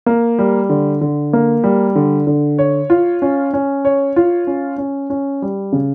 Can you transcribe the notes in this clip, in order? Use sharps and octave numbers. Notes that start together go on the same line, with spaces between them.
A#3
G3
D3
D3
A#3
G3
D3
D3
C#5
F4
C#4
C#4
C#5
F4
C#4
C#4
C#4
G3
C#3